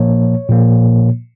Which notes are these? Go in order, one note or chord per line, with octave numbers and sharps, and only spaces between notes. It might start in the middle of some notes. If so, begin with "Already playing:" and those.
Already playing: A#2 F3 A#3 C#5
A#2 F3 A#3